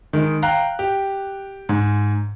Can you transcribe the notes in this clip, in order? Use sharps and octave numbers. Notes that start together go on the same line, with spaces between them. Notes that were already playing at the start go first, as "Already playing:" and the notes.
D#3 G#3
F5 G5 A#5 F#6
G4
G#2